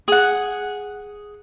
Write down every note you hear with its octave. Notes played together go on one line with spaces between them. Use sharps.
G#4 F#5